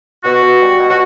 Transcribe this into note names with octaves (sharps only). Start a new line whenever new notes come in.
B2 F#4
B2
G3
B2
F#4